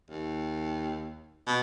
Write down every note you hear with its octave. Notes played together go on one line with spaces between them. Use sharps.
D#2
B2